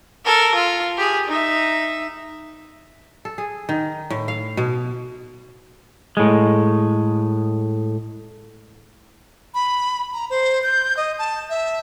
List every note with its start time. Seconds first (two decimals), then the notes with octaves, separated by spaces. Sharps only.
0.25 A4 A#4
0.55 F4
0.97 G4 G#4
1.28 D#4 E5
3.25 A4
3.38 G#4
3.69 D#3
4.10 A2
4.28 F5
4.57 B2
6.17 A2 G#3
9.54 B5
10.13 A#5
10.30 C5
10.63 G6
10.97 D#5
11.19 A5
11.50 E5